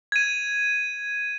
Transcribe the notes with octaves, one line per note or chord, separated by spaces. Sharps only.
G#6 D#7